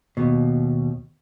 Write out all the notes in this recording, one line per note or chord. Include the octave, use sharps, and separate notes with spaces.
D#2 B2